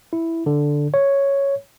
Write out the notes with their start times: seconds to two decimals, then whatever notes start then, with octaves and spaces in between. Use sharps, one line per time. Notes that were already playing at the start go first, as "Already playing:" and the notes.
0.13 E4
0.46 D3
0.94 C#5